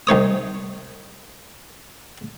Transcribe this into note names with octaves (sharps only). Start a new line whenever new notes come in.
C2 D#4 C#5 D#6